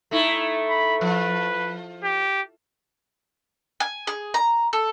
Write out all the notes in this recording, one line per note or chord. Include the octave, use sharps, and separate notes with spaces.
A3 D#4 E4
B5
F3 B4
G4
G#5
G#4
A#5
A4